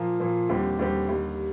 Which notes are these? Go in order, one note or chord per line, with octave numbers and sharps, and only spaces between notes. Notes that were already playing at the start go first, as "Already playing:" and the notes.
Already playing: A#2 F3 A#3
A#2 F3 A#3
D#2 D3 G3 C4 G4
D#2 D3 G3 C4 G4
D#2 D3 G3